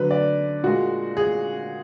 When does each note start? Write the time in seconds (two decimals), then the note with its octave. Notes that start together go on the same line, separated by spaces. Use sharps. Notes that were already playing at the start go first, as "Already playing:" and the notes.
Already playing: D3 F#3 B4
0.11 D5
0.63 A#2 G#3 F#4
1.17 G#4